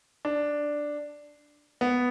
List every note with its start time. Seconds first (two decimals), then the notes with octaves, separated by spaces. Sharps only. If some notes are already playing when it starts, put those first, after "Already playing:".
0.25 D4
1.81 B3